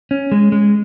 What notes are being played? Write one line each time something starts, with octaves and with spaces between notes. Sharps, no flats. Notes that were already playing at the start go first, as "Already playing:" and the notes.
C#4
G#3
G#3